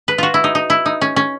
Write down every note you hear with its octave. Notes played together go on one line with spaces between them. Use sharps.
B4
F4 F#4
E4
D#4
D#4
E4
D#4
C#4
C#4